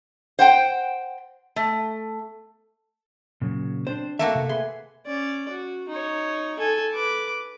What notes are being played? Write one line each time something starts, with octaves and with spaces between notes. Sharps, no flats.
C5 F#5 G5
A3
A#2 C#3 F#3
C4 D4 C5
A3 A#3 F#4 E5
C3
G#4 B4 G#5 C6
C#4 D5
F#4
D#4 C#5
A4 G#5
B4 D6